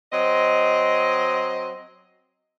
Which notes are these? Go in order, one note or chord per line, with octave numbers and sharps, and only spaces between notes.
F#3 C4 D#5